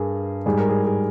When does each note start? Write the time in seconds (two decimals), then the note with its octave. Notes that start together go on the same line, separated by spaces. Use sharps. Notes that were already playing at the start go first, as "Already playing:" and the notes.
Already playing: G2 G#4 A#4
0.46 G#2 G3 G#4
0.58 A#4
0.69 G#4
0.85 G#4